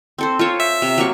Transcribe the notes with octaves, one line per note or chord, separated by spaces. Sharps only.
C4 A4 C5
F4 C5 C#5
E5
C3
F#3 A#3 C#6